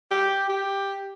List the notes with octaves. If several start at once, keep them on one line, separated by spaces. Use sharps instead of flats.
G4
G4